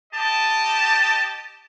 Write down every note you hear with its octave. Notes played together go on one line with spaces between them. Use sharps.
G4 D#5 A5